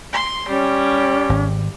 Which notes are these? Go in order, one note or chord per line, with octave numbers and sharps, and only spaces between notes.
C6
G3 C#4
G#1